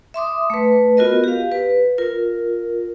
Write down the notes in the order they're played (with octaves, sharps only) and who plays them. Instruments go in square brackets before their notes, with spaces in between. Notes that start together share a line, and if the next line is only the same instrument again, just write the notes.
[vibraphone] E5 C6 D6 D#6
A3 B4
B3 F4 F#4 A#4 D#5
G4 F5
B4
F4 A#4